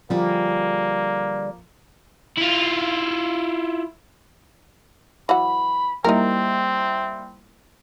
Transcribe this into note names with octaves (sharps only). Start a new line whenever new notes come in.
D3 F3 G3 A#3 G#4
E4 F4
E3 F#3 F#5 B5
G3 A#3 C4 D#4 E4 A#4